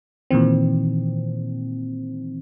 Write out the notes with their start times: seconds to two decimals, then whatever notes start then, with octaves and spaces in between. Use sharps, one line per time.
0.30 A#2 D#3 E3 C4